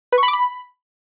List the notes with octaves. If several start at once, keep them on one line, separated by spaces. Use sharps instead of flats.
B4
C#6
B5
D6
B5